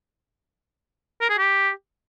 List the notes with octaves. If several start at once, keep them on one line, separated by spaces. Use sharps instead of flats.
A#4
G#4
G4